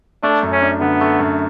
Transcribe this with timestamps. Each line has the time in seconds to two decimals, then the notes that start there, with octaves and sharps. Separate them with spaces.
0.23 A3 D4
0.43 F#2
0.52 C#4
0.62 D4
0.81 D3 B3
1.01 A3
1.19 F#2